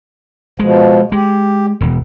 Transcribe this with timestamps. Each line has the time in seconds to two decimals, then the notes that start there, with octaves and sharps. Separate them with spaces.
0.59 B2 F3 G#3
1.12 G#3 G4
1.81 E1 E2